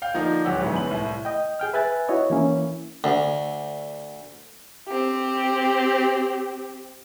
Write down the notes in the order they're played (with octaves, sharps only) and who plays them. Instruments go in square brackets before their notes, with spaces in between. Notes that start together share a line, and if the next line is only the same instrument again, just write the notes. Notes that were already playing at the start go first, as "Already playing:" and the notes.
[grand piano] F5 G5 G6
D3 F3 A#3 D4 D#4
D1 F#3 G4 F#5 E6
D2 G#2 D3 E3 F#3 B3
F#2 B4 F#7
C2 A2
[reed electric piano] D#5 G5
G#4 G5 F6
B4 E5 G#5 F#6 A6
E4 F#4 C#5 D#5
E3 A#3 C#4 E4
[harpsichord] D2
[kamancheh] C4 G4